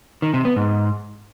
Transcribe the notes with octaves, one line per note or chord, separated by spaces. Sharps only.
D#3
C3
B3
G#2